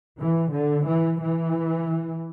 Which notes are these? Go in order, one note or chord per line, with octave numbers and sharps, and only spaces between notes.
E3
D3
E3
E3